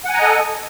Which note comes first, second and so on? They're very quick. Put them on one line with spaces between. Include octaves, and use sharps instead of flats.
F#5 G#5 A#5 D#5 A4